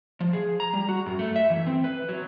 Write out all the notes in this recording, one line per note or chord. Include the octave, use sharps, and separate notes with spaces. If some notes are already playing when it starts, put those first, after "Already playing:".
F3
G#4
A#5
G3
F#4
F#2
A3
E5
E3
C4
B4
F#3